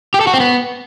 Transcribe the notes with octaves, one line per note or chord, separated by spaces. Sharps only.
G4
A4
F#4
C4
B3